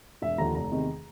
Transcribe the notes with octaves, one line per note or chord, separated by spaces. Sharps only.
E1 E5
D#2 D3 F3 A#5
F1 A#5
E2 C3 D#3